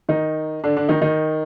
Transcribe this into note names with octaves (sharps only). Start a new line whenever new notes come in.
D#3 D#4
D3 D4
D3 D4
D#3 D#4
D#3 D#4